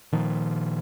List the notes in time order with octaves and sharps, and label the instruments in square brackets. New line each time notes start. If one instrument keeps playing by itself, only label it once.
[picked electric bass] A#2 D#3 F3